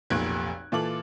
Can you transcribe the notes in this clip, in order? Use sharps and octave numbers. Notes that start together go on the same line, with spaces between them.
F1 B1 A#2 F#6 G#6 D7
A#2 E3 F4 A4 D6 F#7